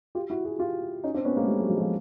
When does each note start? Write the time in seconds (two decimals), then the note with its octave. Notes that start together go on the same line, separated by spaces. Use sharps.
0.15 F4 G4
0.30 E4 F#4
0.45 F#4 G#4
0.59 F4 G4
1.04 C#4 D#4
1.14 C4 D4
1.25 B3 C#4
1.36 G#3 A#3
1.47 G3 A3
1.59 F#3 G#3
1.69 F3 G3
1.76 G#3
1.80 F3 G3